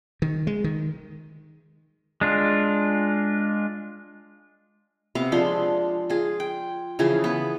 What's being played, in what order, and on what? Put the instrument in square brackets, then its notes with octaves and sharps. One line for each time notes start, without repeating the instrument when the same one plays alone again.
[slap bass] D#3
G#3
D#3
[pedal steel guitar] G#3 D4 F4
[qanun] C3 B3 F5
F3 G#3 D4 C6
F4 G#4
G5
C#3 E3 F3 G#4
B3